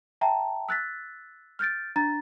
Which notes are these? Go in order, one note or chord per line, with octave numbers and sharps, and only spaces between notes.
E5 G5 A5 A#5
E6 F#6 A6 B6
F6 G6 A6 D7
D4 A#5 A6